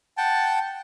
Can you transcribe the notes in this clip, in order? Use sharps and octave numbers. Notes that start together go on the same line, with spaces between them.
F#5 G5 A5